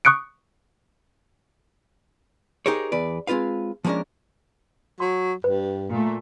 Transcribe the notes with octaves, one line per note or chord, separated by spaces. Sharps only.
C#6 D#6 F#6 C#7 D7
D#4 G4 G#4 A#4 C5 C#5
E2 B4 D5
G#3 C4 F4 B4 F5
F3 G#3 A#3 C#4 D4 A#4
F#3 C6
G2 B4
A#2 A3